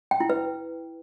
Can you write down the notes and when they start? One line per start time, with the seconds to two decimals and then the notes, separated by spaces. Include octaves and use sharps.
0.11 G5
0.20 E4
0.30 B4